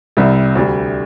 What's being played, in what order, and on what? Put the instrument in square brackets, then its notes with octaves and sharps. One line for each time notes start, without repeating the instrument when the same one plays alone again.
[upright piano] C2 C3 G3
D2 D3 G3